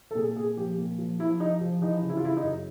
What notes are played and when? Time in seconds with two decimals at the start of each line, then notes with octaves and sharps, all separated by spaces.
0.11 A4
0.15 A#2 G#4
0.36 A#2 G#4
0.57 F3 G4
0.78 A#2
0.99 F3
1.19 F3 E4
1.40 F3 D#4
1.61 F3
1.81 E3 D#4
2.02 C#3
2.09 E4
2.17 F4
2.23 C#3 E4
2.37 D#4
2.43 F#2